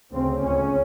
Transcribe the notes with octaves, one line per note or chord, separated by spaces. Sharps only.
D2 C#3 C4
C#2 C#3 C#4